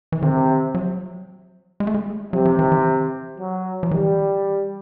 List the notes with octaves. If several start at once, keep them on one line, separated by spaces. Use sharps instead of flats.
E3
C3 D#3
F#3
G#3
A3
G#3
C3 F#3
F3
E3
E3
F#3
F3
E3 G3